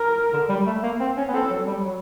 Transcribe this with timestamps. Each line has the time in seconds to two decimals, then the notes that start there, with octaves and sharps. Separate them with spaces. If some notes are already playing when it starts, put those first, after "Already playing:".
Already playing: A#4
0.33 D3
0.49 G3
0.67 A3
0.83 A#3
1.00 C4
1.17 C#4
1.28 B3
1.33 C4 A4
1.50 F#3
1.67 G3
1.85 F#3